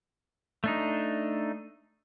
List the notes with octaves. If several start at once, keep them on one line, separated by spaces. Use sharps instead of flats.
A3 D4 D#4